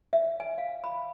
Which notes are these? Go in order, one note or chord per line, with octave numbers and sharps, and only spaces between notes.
E5
G#5
F5
B5